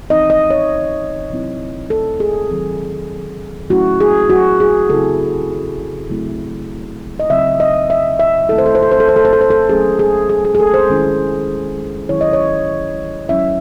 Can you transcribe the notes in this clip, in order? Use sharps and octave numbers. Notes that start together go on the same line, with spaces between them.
E3 C4 D#4 D#5
D#5
C#5
C3 F#3 C4 E4
A4
G#4
D#3 F#3 C4
F#3 A3 C#4 E4 F#4
G#4
F#4
G#4
C#3 F#3 C4 E4 A4
C#3 F#3 A3 C4 E4
D#5
C#3 F#3 C4 E4 E5
D#5
E5
E5
D#3 A3 C4 E4 A4
C5
A4
C5
A4
C5
A4
C5
A4
C5
A4
C5
A4
F#3 A3 C#4 G#4
G#4
G#4
G#4
G#4
A4
C5
D#3 G#3 C#4 E4
D#3 F#3 C#4 E4 C#5
D#5
C#5
F#3 C#4 E4 E5